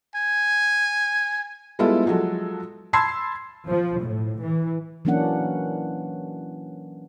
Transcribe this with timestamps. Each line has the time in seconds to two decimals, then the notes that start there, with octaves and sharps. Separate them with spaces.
0.15 G#5
1.79 G3 G#3 B3 E4 F4 A4
2.06 F3 F#3 G#3 F#4 A4
2.93 A5 B5 C6 E6 G#6 C7
3.67 F3
4.00 A2
4.40 E3
5.05 E3 F#3 A#3 C#4 D4 F#5